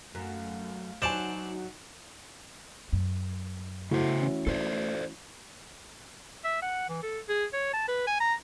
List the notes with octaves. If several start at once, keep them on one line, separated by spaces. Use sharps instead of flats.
F#2 A3 F5
F#3 D#4 F#4 C5 D5 G#5 A5 E7
F#2
C#3 A3 E4 F#4 C5
E3 C#4
A3 A4 C5 D5
E5
F#5
E3
A4
G#4
C#5
A5
B4
G#5
A#5